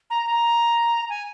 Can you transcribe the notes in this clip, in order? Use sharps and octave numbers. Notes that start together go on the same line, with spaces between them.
A#5
A#5
G#5